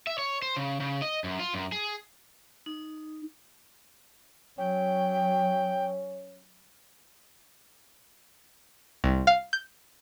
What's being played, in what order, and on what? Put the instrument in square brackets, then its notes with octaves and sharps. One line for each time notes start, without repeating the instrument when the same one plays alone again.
[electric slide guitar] E5
C#5
C5
C#3
C#3
D#5
F#2
F4
F#2
G#4
[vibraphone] D#4
[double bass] F#3 [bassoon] C#4 [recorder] G5
[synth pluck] C2
F5
G6